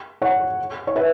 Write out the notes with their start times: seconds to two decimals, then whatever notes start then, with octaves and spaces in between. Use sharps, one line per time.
0.22 C#5 F#5
0.87 C#5
0.96 B4 E5